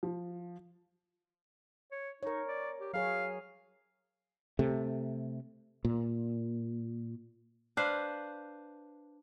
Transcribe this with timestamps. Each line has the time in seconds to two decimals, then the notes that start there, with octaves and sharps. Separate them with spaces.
0.03 F3
1.91 C#5
2.23 D#4 A#4 C#5
2.48 D5
2.80 G4
2.93 F#3 G#4 C#5 F5
4.59 C3 A3
5.85 A#2
7.77 D4 B4 C5 F5